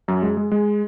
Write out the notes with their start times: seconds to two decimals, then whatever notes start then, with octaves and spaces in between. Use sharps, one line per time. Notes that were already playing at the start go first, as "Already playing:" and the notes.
0.08 F#2
0.22 G#3
0.37 G#3
0.52 G#3